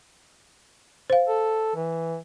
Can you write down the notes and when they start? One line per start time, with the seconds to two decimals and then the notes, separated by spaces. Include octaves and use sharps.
1.10 C5 F5
1.27 A4
1.76 E3